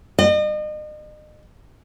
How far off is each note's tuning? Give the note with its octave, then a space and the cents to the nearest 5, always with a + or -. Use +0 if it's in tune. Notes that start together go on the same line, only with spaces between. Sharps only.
D#5 -40